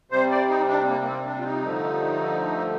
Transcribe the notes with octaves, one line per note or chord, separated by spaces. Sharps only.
C3 G3 C5
D5
D#4
D4
C4
A#3
A#3
C4
D4
F4
D#4
G2 D3 F3 A3